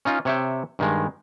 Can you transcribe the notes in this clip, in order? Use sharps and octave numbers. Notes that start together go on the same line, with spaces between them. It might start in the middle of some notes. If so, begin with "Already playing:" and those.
C#4 D#4 F4
C3 C#5 E5 G5
G2 D#3 G#3